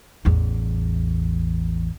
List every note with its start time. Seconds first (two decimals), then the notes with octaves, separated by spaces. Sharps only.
0.25 A1 E2